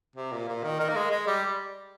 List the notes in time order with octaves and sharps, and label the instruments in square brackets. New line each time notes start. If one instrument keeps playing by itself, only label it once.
[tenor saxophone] C3
A#2
A#2
D#3
D#3
A#3
G#3
G#3
G3